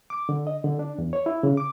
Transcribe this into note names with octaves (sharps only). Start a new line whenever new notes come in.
D6
D3
D#5
D3
D4
E2
C#5
E4
C#3
D6